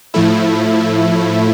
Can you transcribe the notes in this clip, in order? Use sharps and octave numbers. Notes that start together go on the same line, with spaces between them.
A2 F3 A3 E4